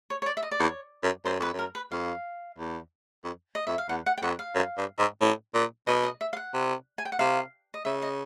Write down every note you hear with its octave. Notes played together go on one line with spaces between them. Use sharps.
C#5
C#5
D5
E5
D#5
D5
E2 C#5
F#2
F#2 C5
F2 B4
F#2
A#4
B4
F2 F5
E2
F2
D#5
F2 E5
F5
E2 F#5
F#5
G5
F2 F#5
F5
F#2
G2
G#2
A2
A#2
B2 D#5
D#5
E5
F5
F#5
C3
G#5
G5
F#5
C3 F5
D#5
C#3 E5
D#5